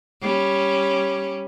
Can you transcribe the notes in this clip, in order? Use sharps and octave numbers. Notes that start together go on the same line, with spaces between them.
G3 C#4